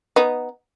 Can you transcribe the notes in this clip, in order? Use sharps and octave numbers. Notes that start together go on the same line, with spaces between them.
B3 D#4